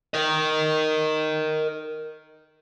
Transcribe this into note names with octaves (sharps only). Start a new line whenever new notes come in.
A#4 D#5